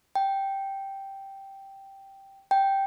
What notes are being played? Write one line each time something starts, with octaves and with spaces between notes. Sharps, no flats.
G5
G5